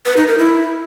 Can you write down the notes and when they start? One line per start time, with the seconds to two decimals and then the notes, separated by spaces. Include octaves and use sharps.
0.06 B4
0.17 D#4
0.27 A#4
0.38 E4